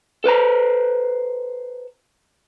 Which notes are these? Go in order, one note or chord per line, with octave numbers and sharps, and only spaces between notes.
A4 B4 C5 A#5